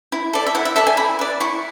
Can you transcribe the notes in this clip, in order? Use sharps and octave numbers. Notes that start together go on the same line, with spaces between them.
E4
A4 D5
E5
E4 F#5
E5
A4 D5 E5
G#5
E4 B5
B4 D5
E4 C#6